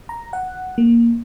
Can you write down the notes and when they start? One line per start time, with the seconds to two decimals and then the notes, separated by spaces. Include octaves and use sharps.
0.09 A#5
0.33 F#5
0.78 A#3